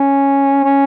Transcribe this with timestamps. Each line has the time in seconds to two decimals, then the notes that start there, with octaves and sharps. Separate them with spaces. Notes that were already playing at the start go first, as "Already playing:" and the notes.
Already playing: C#4
0.64 C#4